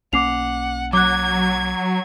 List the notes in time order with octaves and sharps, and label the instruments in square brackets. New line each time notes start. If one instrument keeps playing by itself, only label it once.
[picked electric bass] B1 A#3 C#4 [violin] F#5 [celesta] D6 C7 F7
[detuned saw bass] F#3 [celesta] D6 F#6 [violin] G#6